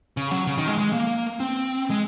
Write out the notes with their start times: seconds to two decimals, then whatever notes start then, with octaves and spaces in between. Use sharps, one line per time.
0.17 C#3
0.31 F#3
0.47 C#3
0.58 D#3
0.68 G#3
0.78 G#3
0.93 A#3
1.40 C4
1.90 G#3